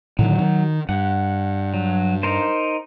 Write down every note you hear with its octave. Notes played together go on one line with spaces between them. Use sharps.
A2 D3 D#3 F#3
D#3
G2 F#5
F#3
D#4 A#4 C5